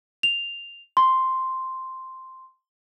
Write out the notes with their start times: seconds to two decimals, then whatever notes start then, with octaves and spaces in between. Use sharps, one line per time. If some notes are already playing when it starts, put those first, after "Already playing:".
0.23 F7
0.97 C6